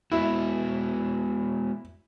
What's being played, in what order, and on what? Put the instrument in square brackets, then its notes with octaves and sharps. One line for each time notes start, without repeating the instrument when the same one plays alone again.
[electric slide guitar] G#3 B3 F#4 [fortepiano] E4